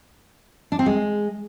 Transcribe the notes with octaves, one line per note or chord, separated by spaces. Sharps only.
D4
C4
G#3